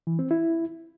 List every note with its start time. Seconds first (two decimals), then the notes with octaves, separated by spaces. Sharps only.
0.07 E3
0.19 C4
0.31 E4